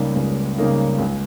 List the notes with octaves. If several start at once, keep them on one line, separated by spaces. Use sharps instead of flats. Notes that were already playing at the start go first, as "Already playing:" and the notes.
Already playing: C#2 C#3 G3 A#3 D#4
C#2
C#3 G3 A#3 D#4
C#2